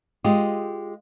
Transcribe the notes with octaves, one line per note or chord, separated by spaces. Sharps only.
G#3 F4 G4 D#5